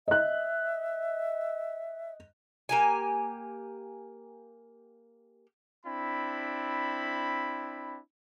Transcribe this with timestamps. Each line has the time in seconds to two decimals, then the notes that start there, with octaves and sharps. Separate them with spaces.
0.08 D#5 E5 F#6
2.69 A#3 G4 G#5
5.86 C4 D4 E4 B5